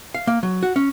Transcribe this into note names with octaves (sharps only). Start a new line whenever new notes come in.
F5
A#3
F#3
F#4
C#4